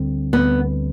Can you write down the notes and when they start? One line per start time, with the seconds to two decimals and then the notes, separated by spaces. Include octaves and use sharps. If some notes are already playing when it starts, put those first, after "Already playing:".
Already playing: D2 D3 G3 C4
0.33 D2 D3 G3 B3 C4